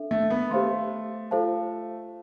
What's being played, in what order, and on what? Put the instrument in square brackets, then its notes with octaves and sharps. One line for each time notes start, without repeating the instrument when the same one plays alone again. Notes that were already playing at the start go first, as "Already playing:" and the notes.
Already playing: [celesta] D4 A4 E5
[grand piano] A3
B3
[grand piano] A3 [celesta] G4 C5 F5 C6
[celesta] F4 A4 C5 F5 A5